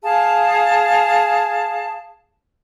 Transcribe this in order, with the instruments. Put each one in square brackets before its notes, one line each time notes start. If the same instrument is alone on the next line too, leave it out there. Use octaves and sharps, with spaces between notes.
[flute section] G#4 F5 A5